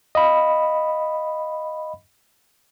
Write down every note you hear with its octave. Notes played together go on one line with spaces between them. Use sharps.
D#5 F5 B5